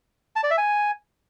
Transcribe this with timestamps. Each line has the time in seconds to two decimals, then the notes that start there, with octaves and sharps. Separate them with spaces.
0.36 A5
0.43 D5
0.51 E5
0.58 G#5